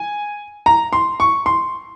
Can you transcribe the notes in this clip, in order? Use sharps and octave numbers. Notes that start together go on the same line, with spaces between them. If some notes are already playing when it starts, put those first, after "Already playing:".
Already playing: G#5
A#5
C6
C#6
C6